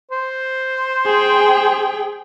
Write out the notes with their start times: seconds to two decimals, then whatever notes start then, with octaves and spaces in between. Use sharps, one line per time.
0.12 C5
1.06 G#4 G5